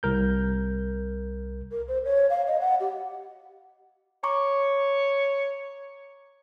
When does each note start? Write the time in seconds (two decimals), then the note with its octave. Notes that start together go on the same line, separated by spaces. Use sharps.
0.03 C2 A#4 G6
1.71 A#4
1.88 C5
2.04 C#5
2.30 F5
2.47 D#5
2.60 F#5
2.80 G4
4.23 C#5 A#5 C#6 D6